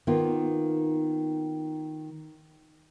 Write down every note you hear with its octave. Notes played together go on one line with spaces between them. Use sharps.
D#3 A#3 B3 F4